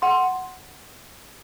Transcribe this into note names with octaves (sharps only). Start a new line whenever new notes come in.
F#5 C6